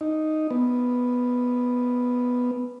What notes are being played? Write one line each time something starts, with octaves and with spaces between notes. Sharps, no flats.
D#4
B3